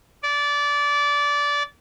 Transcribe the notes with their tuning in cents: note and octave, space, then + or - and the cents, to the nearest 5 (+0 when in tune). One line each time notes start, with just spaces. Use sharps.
D5 -20